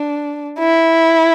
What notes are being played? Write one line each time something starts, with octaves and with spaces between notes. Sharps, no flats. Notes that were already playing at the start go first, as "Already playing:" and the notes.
Already playing: D4
E4